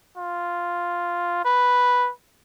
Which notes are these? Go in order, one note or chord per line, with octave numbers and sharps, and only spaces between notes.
F4
B4